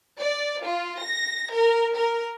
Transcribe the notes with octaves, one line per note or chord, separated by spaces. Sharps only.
D5
F4
A#6
A#4
A#4